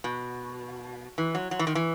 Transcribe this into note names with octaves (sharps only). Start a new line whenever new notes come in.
B2
E3
F#3
F#3
E3
D#3
E3